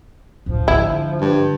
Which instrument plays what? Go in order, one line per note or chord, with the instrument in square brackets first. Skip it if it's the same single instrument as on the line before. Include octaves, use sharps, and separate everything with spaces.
[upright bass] D2 A2 [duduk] F3
[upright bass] G#2 D3 [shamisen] E4
[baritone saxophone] G2